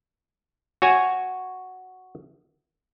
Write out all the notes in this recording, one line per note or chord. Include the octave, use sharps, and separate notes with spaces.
F#4 C#5 G#5